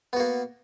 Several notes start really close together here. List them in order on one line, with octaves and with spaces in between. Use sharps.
B3 F#4 A#3